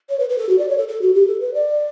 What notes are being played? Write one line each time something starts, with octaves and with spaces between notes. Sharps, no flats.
C#5
B4
B4
A4
F#4
D5
C#5
A4
A4
F#4
G4
A4
B4
D5